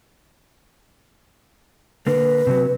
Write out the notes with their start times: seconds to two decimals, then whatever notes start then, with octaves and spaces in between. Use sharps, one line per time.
2.07 D3 A#3 B4
2.47 C3 F#3